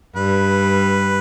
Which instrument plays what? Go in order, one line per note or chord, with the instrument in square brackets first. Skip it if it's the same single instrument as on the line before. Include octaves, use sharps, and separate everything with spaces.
[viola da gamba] G2 G3 [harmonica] B4